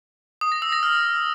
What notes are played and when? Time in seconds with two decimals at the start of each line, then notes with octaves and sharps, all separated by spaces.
0.41 D#6
0.52 A#6
0.62 E6
0.72 A#6
0.83 F6